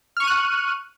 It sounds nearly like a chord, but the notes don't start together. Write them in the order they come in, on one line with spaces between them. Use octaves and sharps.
F6 C#6 D#7 F#6